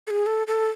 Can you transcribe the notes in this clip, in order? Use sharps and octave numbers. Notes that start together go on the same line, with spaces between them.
A4
G#4
A4
A4